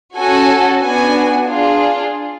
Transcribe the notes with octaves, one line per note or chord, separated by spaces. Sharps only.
C#4 F#4 A4 G#5
B3 D4 F#4 G#5
D4 F4 G#4